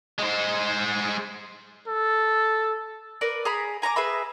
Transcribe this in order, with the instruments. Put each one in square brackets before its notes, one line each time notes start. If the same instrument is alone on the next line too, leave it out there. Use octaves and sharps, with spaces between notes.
[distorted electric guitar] G#3 C5
[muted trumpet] A4
[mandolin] A#4 B4 D5
G#4 A#5 B5
G#5 A#5 C#6 D6
G#4 B4 E5 B5